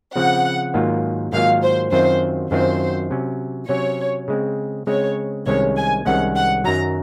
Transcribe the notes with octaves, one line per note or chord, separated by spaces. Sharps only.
C#3 F3 C4 F#5
G#2 D#3 F#3 A#3 F4
G#2 D#3 F#3 A#3 F4 F5
C5
F#2 D#3 F#3 C4 F4 C5
F#2 D#3 F#3 C4 F4 C5
C3 F#3 C#4
C3 F#3 C#4 C#5
C#3 G#3 C4
C#3 G#3 C4 C#5
C2 C3 D#3 G#3 C#4 C#5
G#5
C2 C3 D#3 G#3 C#4 F#5
F#5
F#2 D#3 F#3 A#5